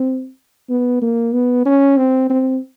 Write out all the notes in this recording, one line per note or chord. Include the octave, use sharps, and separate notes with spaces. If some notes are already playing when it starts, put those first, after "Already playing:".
Already playing: C4
B3
A#3
B3
C#4
C4
C4